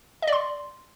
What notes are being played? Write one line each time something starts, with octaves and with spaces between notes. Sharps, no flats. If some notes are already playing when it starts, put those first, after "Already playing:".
D#5
D5
C6